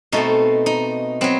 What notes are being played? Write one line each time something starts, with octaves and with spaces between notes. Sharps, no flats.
B2 A3 C4 D#4
D#4
F#3 B3 C4